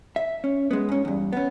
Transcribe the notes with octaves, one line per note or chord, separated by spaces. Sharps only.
E5
C#4
G#3 B3
G#2 C#4
E2 G2
B3 C#4